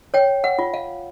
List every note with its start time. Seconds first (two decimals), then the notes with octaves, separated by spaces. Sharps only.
0.14 C#5 G5
0.44 F#5
0.59 F4
0.74 F5